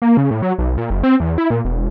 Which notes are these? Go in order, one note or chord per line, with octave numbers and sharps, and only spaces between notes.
A#3
C#3
A2
F#3
B1
A#2
F#1
C4
E2
E4
A#2
E1